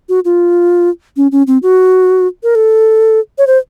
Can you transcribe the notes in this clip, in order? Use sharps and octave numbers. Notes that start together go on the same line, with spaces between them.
F#4
F4
C#4
C#4
C4
F#4
A#4
A4
C#5
C5